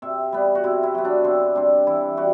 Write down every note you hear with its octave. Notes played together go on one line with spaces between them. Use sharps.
C3 E5
G3 B3
F#4
C3 E4
E4
F#3 B3
D4
D3 C4
G3 C4 D4
E3 E4
G3 F#4